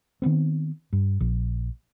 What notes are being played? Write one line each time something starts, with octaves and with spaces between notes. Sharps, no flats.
D#3 F#3 B3 C4
G2
A#1